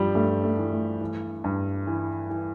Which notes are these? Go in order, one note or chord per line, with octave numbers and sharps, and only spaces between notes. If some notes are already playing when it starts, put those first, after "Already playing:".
Already playing: G2 F3 G3
G2 A3
A3
E3
A3
E3
G2
E3
E3